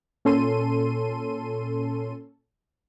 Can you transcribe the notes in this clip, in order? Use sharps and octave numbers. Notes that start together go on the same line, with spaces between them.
A#2 C#4 A4 C6 D#7